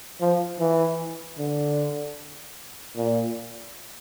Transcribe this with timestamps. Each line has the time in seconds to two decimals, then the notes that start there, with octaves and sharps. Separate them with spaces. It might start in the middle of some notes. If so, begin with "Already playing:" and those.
0.21 F3
0.60 E3
1.38 D3
2.97 A#2